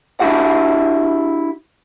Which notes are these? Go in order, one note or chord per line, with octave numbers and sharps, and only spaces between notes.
D4 E4 F#4 G4 F#5